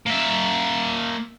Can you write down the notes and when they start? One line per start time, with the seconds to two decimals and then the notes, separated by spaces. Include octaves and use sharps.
0.06 A#3 E5